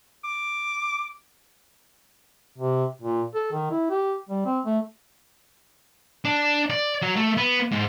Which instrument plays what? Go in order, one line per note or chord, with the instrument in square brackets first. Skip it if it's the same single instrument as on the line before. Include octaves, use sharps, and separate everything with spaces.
[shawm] D6
[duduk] C3
A#2
A4
D#3
E4
G4
G3
C4
A3
[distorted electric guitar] D4
D5
F#3
A3
B3
G#2